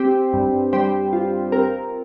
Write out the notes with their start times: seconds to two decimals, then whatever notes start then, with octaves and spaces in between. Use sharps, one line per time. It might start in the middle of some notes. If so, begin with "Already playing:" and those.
Already playing: C4 G4 C5
0.33 G2
0.73 G3 G4 C5
1.13 F4
1.52 C4 A#4